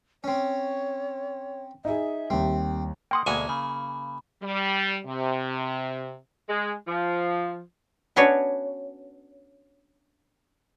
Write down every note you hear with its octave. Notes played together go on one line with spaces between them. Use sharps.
C4 C#4 C#5
D#4 G#4 E5
D#2 G3 C4
A#3 F#5 G5 C6 D#6
D2 B2 G#3 A#3 G#5 C#6
C#3 B5
G3
C3
G#3
F3
B3 C#4 D4 F#4 B4 C#5